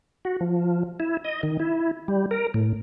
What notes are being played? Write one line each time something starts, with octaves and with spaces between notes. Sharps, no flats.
F#4
F3
E4
D#5
D#3
E4
G3
A#4
A2